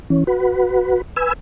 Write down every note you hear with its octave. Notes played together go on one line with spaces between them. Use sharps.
E3 C#4
F#4 B4
B4 G#5 E6